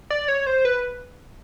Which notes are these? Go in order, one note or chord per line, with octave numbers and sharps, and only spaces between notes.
D5
C#5
C5
B4